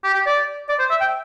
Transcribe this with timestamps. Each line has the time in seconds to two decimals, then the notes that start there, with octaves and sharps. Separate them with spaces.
0.04 G4
0.14 G4
0.26 D5
0.69 D5
0.79 C5
0.90 E5
1.01 G5